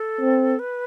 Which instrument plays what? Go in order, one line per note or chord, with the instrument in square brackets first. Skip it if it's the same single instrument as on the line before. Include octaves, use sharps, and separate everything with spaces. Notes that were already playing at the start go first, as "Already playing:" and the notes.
Already playing: [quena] A4
[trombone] C4
[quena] B4